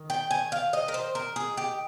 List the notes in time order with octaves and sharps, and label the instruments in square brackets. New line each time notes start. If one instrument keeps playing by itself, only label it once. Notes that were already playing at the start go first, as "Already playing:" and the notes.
Already playing: [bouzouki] D#3
G5
G#5
F5
D#5
A#4
C5
A#4
G#4
G4